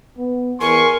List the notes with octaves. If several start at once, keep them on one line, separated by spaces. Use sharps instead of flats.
B3
E2 A#4 G#5 C6 C#6